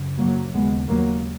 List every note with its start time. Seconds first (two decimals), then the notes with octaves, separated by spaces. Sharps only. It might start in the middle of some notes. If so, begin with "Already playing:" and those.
Already playing: F#2 C#3
0.18 F#3 A#3
0.53 D#2 C#3 G#3 B3
0.89 F#3 A#3